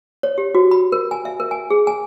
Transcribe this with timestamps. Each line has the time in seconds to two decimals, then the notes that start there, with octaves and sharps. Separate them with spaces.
0.23 C#5
0.38 G4
0.55 F#4
0.71 B5
0.92 A#4
1.11 G#5
1.25 E5
1.40 A#4
1.51 G#5
1.70 G#4
1.87 G#5